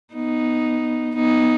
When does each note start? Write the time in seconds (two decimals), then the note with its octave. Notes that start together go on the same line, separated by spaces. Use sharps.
0.14 B3 D#4
1.16 B3 D#4